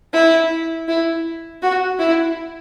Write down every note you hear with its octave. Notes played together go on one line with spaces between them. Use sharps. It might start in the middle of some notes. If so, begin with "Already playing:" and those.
E4
E4
F#4
E4